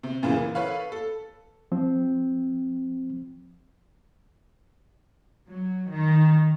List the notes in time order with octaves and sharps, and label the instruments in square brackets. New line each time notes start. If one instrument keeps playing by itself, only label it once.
[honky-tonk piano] C3
F#2 A#2 C#3 E3 F3
E3 A#3
A4 B4 C#5 F5
A4
[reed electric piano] F3 C4
[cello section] F#3
D#3